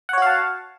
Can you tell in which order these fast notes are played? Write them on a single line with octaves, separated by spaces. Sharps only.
F#5 C#5 F#4 F5 A5